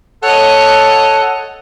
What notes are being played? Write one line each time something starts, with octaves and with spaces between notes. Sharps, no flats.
A4 C#5 D#5 F#5